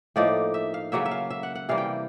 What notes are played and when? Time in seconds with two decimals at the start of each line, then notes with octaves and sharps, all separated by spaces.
0.16 A2 F3 A#3 D#4 D5
0.54 E5
0.74 F5
0.92 C#3 F#3 A#3 E5
1.05 E5
1.11 F5
1.30 E5
1.43 F#5
1.55 F#5
1.69 C3 E3 G3 A#3 F5
1.78 G5